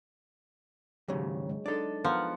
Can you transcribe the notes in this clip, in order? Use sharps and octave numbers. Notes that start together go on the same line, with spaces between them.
D#2 G#2 C#3 F#3 G4 C#5
G#3
D4 D#4 A4 D5
F3 B3 A#4 F#5